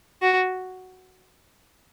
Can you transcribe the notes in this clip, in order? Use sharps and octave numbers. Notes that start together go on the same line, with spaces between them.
F#4